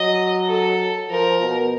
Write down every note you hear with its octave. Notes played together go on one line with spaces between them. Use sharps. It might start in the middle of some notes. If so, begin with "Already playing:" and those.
Already playing: F#3 D#5
A4
F3 A#4
B2